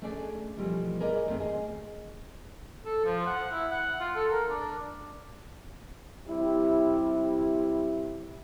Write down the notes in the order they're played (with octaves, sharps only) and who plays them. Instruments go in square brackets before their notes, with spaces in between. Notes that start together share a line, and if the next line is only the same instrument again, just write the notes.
[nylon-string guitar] A3 C#4 D4 G#4 D5
B2 E3 F3 G3 A3
G#4 A#4 B4 D5 D#5
D3 D#3 A3 C4 C#4
G#4 D#5
[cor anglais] A4
F3
F#5
E4
F#5
F4
A4
A#4
D4
[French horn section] C3 G3 E4